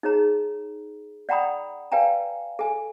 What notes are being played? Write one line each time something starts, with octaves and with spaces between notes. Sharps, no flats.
D#4 G#4 C#5 A#5
D5 F#5 G5 A#5 B5 D#6
B4 D5 F5 G5 G#5 A#5
A4 G#5